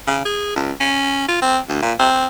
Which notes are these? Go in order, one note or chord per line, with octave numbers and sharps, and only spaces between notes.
C#3
G#4
C#2
C#4
F4
C4
D2
A#2
C4